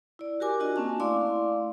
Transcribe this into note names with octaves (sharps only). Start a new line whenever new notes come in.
E4 D5
F#4 G4 A#4 G#5 D6
D4 F4 F#4 D#5 G#5
A#3 C4 C#4 A5
A3 E4 D5 F5 C6 D6